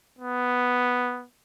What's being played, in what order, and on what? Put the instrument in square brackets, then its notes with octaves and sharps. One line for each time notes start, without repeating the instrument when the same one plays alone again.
[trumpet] B3